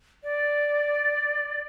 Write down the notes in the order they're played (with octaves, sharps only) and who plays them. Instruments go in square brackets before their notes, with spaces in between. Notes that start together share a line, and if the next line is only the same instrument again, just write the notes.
[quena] D5